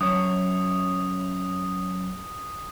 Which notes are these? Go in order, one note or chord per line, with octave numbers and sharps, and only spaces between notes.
F#2 C#5 D#6